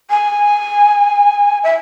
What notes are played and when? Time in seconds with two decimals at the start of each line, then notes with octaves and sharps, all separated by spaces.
0.10 G#5
1.64 E5